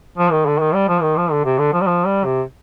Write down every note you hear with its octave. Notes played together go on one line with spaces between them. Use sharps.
F3
D#3
D3
D#3
G3
F3
D#3
F3
D3
C3
D3
F3
G3
F3
G3
C3